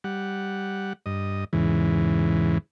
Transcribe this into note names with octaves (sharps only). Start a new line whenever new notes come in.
G3 F#5
G2 D#5
E2 G#2 C#3 E3